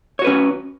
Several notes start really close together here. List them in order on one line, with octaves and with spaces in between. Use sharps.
C#5 F#4 B4 C#4